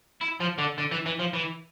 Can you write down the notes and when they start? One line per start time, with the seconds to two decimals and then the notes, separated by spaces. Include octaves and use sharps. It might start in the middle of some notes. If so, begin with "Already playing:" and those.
0.21 E4
0.40 F3
0.58 D3
0.78 D3
0.92 E3
1.06 E3
1.19 F3
1.33 E3